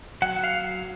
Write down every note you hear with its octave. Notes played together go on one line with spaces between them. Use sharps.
F#3 F#5
F5